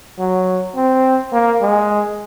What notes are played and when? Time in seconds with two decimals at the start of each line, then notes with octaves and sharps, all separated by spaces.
0.19 F#3
0.76 C4
1.33 A#3
1.61 G#3